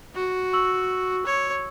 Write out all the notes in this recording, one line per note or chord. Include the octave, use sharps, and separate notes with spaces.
F#4
C#6 E6 F#7
C#5